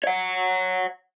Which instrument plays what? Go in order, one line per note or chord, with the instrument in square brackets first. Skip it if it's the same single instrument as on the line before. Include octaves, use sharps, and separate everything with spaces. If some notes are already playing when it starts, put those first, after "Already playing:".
[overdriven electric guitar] C#5 F#5